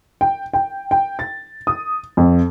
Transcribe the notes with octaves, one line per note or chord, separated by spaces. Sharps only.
G5
G5
G5
A6
D#6
F2